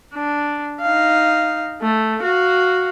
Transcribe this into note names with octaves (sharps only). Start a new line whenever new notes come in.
D4
D#4 F5
A3
F#4 F5